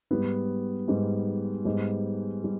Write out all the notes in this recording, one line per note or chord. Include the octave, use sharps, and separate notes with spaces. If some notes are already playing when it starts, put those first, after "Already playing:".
G#2 G3 B3
G#2 G3 B3
G#2 G3 B3
G3